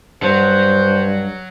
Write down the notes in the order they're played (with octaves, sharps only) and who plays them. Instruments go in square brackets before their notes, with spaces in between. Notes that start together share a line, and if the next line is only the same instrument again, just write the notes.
[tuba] G2 [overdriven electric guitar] F#3 [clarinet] C5